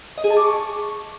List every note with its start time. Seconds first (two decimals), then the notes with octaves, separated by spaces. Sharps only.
0.18 D#5
0.24 G#4
0.30 A5
0.37 D6
0.43 C#6